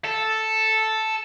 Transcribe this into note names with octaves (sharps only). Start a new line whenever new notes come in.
A4